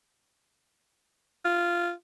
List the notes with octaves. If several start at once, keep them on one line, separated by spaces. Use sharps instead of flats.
F4